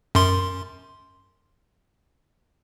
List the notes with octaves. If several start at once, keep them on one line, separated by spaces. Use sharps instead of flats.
F#2 C6